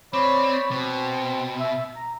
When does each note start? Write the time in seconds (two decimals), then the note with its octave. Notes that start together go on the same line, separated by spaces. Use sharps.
0.13 C4 C#5 D5 B5
0.71 B2 C4
1.60 E5
1.96 A#5